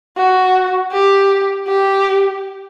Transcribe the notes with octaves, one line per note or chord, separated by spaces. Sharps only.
F#4
G4
G4